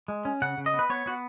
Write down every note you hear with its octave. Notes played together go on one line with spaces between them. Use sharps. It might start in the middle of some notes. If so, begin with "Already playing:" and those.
G#3
C#4
C#3 F#5
C#3
D#5
B3
B4
B3 C#5
B3 F#4